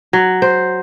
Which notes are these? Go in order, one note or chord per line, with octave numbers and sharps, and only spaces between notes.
F#3
C5